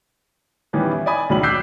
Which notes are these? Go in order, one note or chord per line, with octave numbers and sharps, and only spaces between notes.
D#3 E3 G3 B3 C#4
E3 E5
D5 D#5 G#5 B5 D#6 G#6
C#2 D#3 F#3 D4 B5 F#7
D6 E6 F#6 G6 B6 C7